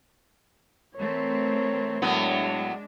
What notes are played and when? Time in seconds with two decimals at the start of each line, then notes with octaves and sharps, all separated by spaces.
0.96 E3 A3 C4 A#4 C#5
2.02 A2 F#3 G#3 B3 D4